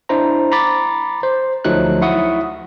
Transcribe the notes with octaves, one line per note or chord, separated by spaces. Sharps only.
D4 E4 C5 A#5
A#5 B5 D6 A6
C5
D2 F3 F#3 A3 D#4 F#6
E4 E5 F#5 C#6 D#6